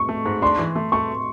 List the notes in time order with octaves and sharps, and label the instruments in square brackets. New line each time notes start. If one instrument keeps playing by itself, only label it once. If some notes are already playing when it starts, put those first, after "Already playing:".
Already playing: [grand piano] C#6
[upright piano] A3
G#2
[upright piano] D4 [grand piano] C6
[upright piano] E3
A3
[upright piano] A3 [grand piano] C#6